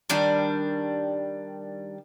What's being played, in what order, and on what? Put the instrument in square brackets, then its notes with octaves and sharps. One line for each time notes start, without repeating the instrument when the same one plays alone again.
[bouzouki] D#3 G3 D4